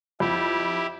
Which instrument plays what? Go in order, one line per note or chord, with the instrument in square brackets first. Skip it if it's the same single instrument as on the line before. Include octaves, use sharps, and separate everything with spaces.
[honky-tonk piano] F2 [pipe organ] E4 G4